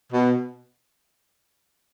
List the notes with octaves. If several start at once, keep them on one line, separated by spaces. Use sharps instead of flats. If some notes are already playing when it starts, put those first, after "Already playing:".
B2